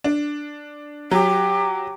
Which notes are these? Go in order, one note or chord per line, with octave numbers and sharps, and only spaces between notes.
D4
F#3 G4